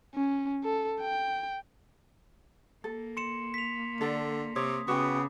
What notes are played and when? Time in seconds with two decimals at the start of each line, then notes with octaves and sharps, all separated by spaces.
0.15 C#4
0.64 A4
1.01 G5
2.84 A#3 A4
3.17 C6 C#7 E7
3.54 B6 F7
4.01 D3 D4 A4
4.56 C3 C#5 D#6
4.88 C#3 B3 F#4 G5 D6